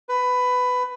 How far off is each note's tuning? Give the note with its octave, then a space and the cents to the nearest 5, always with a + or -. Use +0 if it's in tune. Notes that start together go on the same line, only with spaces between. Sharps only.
B4 +15